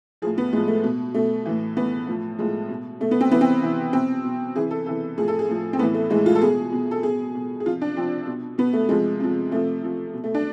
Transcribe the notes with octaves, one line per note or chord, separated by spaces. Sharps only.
A2 F3 G#4
B3
A2 F3 G#3
A3
B2
B2 A3
A2 E3
A2 E3 B3
A2 F3
A2 F3 G#3
B2
B2 A3
B3
C4
C3 E3 B3
C4
C3 E3
B2 C4
B2
C3 E3 G#4
A4
C3 E3 A4
A2 F3 G#4
A4
G#4
A2 F3
C4
A2 E3 B3
A3
A2 E3 G#3
F4
A4
B2 G#4
B2
A4
B2 G#4
B2
G#4
C3 F3 F4
D4
C3 F3 C4
B2
B2 B3
A3
C3 F3 G#3
C3 F3
C3 F3 A3
C3 F3
B2
A3
D4